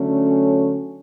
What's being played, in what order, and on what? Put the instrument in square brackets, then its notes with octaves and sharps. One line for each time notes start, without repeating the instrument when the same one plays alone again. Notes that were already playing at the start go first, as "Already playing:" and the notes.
Already playing: [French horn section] D3 F#3 A3 C#4